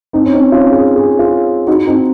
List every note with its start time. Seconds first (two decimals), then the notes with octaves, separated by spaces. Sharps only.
0.13 C4 D#4
0.26 C#4
0.33 C4 D#4
0.52 C#4 F4
0.72 G#4
0.96 G#4
1.19 F4 G#4
1.67 D#4 F#4
1.87 C4 D#4